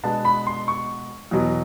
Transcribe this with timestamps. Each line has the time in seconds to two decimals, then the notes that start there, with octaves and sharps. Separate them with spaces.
0.04 B2 G#3 B3 D4 A5
0.25 B5
0.47 C6
0.68 C#6
1.31 E2 B2 F#3